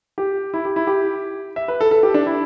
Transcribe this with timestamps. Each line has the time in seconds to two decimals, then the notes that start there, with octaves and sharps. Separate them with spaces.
0.18 G4
0.54 E4
0.65 G4
0.76 E4
0.87 G4
1.56 E5
1.68 B4
1.81 A4
1.91 A4
2.03 G4
2.14 D4
2.26 E4